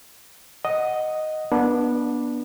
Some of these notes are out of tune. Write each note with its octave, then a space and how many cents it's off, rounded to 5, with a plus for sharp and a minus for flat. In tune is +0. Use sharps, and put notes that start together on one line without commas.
D#5 +0 F#5 +0
B3 -25 D4 +0